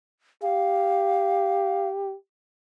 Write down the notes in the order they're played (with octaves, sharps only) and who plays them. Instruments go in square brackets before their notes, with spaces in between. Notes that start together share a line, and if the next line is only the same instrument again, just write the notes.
[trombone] G4 [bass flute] F5